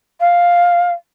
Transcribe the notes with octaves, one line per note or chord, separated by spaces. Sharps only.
F5